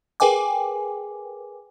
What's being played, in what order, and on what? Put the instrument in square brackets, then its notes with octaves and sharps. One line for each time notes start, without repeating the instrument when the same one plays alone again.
[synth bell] G#4 A#4 B4 G5 G#5 D6